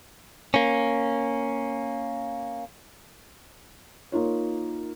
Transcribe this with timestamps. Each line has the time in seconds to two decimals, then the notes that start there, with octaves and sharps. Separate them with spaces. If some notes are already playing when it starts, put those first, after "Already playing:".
0.54 A#3 C#4
4.12 A#3 D#4 F4 C#5